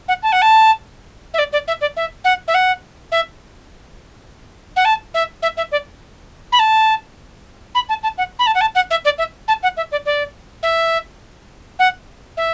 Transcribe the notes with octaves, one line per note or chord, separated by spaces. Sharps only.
F#5
A5
F#5
A5
E5
D5
D5
E5
D5
E5
F#5
E5
F#5
E5
F#5
A5
E5
E5
E5
D5
B5
A5
B5
A5
A5
F#5
B5
A5
F#5
A5
F#5
E5
D5
E5
A5
F#5
E5
D5
D5
E5
F#5
E5